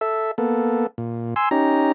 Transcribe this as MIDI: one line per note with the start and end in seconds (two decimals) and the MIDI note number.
0.01 0.31 69
0.01 0.31 76
0.38 0.87 58
0.38 0.87 59
0.38 0.87 69
0.98 1.34 46
1.36 1.49 80
1.36 1.49 84
1.36 1.49 88
1.51 1.92 61
1.51 1.92 63
1.51 1.92 67
1.51 1.92 82